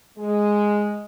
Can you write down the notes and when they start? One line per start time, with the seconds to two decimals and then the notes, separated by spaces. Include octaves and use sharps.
0.17 G#3